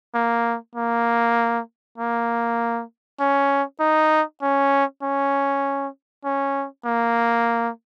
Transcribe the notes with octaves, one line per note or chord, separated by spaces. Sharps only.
A#3
A#3
A#3
C#4
D#4
C#4
C#4
C#4
A#3